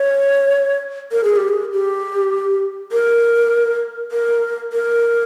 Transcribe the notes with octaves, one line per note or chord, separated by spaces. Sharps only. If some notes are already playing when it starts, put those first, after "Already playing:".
Already playing: C#5
A#4
G#4
G4
G#4
G4
A#4
A#4
A#4